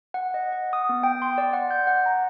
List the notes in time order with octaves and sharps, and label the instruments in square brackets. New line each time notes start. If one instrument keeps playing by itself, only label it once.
[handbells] F#5
D#5
F#5
D#6
B3
G5
C6
D5
F#5
G6
F#5
A#5